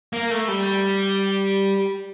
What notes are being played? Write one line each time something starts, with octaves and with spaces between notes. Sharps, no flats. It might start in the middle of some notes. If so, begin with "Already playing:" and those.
A#3
A3
G3